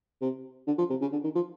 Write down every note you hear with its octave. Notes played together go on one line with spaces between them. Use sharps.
C3
D3
F3
C3
C#3
D3
D#3
F3